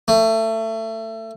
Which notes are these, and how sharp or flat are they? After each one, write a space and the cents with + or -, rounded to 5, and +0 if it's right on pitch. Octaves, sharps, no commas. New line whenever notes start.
A3 +25